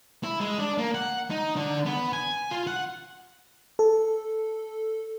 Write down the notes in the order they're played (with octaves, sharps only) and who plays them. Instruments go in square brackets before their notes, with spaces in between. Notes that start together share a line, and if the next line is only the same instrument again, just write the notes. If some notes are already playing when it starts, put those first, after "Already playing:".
[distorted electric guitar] E4
G#3
D4
A#3
F#5
D#4
D3
B3
G#5
F4
F#5
[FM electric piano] A4